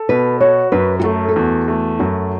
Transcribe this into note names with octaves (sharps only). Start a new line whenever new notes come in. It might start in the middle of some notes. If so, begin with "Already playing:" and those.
Already playing: A4
B2 B4
F#4 C#5
F#2 B4
F#4
A3 A4
A4
E2 F#4
A3
F#2 F#4